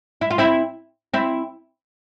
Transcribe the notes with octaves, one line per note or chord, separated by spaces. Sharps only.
E4
F4
C4 E4
C4 E4